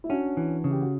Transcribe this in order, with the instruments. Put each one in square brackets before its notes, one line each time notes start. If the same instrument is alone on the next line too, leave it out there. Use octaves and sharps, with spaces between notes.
[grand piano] E4
[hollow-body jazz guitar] C#4 [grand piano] D4 F#4
[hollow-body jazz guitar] E3
C#3
[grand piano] G4
F#4